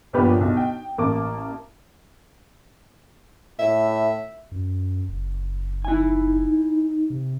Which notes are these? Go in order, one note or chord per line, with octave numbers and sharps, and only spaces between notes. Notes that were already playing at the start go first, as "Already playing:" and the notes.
G1 A#2 F3 B3 G4 B4
B1
G5
A1 A#3 A5 D6
A2 E5
F#2
F#1
D#4 E4 G#5
C3